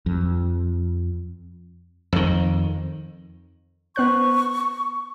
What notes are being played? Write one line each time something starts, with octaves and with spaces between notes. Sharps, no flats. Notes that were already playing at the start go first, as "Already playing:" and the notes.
F2
F2 D#3
B3 C5 C#6 F#6